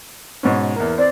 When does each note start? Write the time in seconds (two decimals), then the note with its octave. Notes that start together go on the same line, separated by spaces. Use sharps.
0.43 G#2 B2 C#4
0.76 E2 A#3
0.98 C4 D5